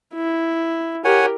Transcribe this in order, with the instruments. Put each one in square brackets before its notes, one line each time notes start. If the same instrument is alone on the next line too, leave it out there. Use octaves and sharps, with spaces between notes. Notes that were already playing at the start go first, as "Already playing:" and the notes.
[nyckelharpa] E4
[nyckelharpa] G4 A#4 [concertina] C#5 F#5 G#5